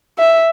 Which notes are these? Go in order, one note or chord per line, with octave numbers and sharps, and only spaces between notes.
E5